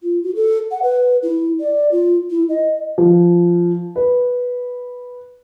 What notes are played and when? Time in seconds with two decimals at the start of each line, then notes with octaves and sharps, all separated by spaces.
0.03 F4
0.23 F#4
0.35 A4
0.71 F#5
0.83 B4
1.23 E4
1.60 D5
1.92 F4
2.31 E4
2.49 D#5
2.98 F3
3.96 B4